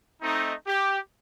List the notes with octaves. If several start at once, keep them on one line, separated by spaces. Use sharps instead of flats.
A3 C4 D#4
G4